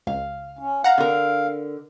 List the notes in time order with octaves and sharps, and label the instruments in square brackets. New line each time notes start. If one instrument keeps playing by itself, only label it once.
[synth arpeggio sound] C#2 [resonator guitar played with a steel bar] F5
[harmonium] C#4
[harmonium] F5 [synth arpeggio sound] F#5 A#5
[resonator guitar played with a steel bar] D3 A#4